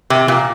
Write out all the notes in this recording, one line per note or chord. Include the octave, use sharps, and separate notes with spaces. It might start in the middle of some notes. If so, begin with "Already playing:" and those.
C3
A#2